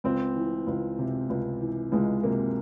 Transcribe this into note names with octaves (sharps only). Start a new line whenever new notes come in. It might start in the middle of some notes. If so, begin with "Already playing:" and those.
C#2 C4
E3
C#2
C3
C#2
E3
C#2 G#3
C3 A#3